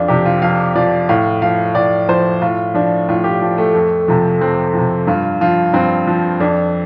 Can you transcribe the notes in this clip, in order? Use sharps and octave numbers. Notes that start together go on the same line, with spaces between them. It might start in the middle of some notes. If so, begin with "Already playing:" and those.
Already playing: F2 D4 F4
C3 F3 G4
F4
F2 F5
C3 F3 D5
A2 F5
F3 F5
A2 D5
F3 C5
A2 F4
F3 D4
A2 F4
G4
F3
A3
F2
C3 F3
F2 C4
C3 F3
G2 F4
F3 F4
G2 C4
F3
F2 D4